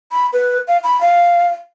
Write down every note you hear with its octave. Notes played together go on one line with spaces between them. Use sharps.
B5
B4
F5
B5
F5